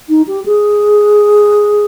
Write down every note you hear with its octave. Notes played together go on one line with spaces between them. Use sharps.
D#4
G4
G#4